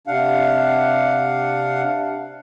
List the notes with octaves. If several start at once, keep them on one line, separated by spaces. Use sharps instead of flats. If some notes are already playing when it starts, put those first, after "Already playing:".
C3 D4 F5 F#5